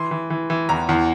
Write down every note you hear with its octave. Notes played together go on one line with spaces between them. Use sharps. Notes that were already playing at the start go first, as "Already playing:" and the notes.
Already playing: E3 C6
E3
E3
E3
E2 A#5
E2